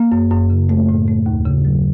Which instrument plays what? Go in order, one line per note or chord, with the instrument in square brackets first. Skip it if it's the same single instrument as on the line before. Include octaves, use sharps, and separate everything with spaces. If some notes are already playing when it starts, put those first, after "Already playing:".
Already playing: [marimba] A#3
F#2
F#2
C#3
A3
A2
A3
D#2
C#3
F#3